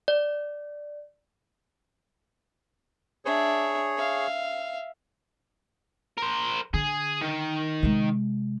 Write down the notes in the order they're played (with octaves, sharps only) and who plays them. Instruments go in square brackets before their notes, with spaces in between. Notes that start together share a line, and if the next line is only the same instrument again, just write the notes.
[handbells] D5
[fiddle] D4 E5 [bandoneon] G#4 C#5
[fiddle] E5 F5
[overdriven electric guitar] A#4 C5
[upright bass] D3 [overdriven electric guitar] G#4
[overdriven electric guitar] D#3
[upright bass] C3 G#3